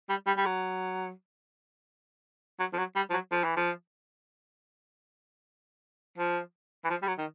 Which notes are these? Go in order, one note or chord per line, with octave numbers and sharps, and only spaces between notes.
G3
G3
G3
F#3
F#3
F3
F#3
G3
F3
F#3
F3
E3
F3
F3
E3
F3
G3
F#3
D#3